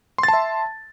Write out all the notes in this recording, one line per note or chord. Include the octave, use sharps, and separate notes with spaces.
E5 A5 C6 A6